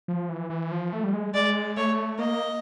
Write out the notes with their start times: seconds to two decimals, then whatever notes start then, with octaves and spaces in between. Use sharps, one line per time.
0.08 F3
0.29 E3
0.50 E3
0.72 F3
0.93 A3
1.04 G3
1.13 G#3
1.34 G#3 D5
1.77 A3 C#5
2.19 A#3 D#5